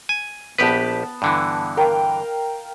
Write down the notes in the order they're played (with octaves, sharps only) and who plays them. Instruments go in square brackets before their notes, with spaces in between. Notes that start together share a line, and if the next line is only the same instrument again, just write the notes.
[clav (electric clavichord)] G#5
[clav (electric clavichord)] A#1 G4 B4 [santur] B3 A5
[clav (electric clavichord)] G2 D3 E3
[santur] A#4 F5 G5